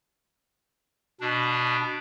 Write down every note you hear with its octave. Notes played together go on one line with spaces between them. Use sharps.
B2 D4